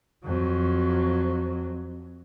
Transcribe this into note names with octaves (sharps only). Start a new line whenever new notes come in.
F2 F#3